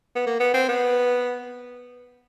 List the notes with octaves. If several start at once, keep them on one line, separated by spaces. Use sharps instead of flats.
B3
A#3
B3
C4
B3